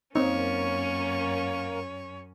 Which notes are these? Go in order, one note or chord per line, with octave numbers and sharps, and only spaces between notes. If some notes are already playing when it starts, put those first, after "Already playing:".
F#2 A#3 C4 C#4 D#4 A#4 C#5